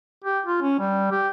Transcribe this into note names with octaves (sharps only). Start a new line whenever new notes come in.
G4
F4
C#4
G3
G4